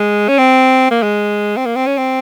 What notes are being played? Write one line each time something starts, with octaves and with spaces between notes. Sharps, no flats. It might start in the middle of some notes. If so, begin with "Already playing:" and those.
Already playing: G#3
C#4
C4
A#3
G#3
C4
A#3
C4
C#4
C4